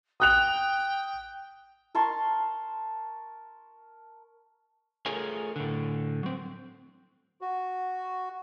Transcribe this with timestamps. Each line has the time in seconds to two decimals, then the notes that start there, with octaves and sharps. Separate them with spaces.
0.20 G5 D#6 F#6 F7
1.95 A#4 A5 C6 C#6
5.06 A3 F4 G#4 A#4 C#5 G#5
5.56 A2 D3
6.23 F#3 C4
7.41 F#4